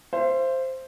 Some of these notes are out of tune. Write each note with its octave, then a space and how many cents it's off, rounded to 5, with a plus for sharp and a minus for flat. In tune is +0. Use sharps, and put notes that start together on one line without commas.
C5 +0 E5 +45